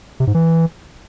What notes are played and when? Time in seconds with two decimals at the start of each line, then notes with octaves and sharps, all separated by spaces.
0.20 C3
0.27 G#2
0.34 E3